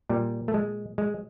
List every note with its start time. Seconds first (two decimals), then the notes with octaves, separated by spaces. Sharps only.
0.09 A#2 G3
0.48 A3
0.54 G#3
0.98 G#3